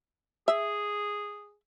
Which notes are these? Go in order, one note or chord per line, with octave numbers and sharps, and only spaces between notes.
G#4 E5